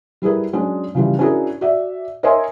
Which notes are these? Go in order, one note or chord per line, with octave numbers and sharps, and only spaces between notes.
G3 E4 G#4 A#4 B4
F#3 G#3 C#4 D4
C#3 E3 F3 G3
C#4 D4 E4 F#4 G#4 A#4
F#4 D5 E5
A#4 C#5 D#5 E5 G#5 C6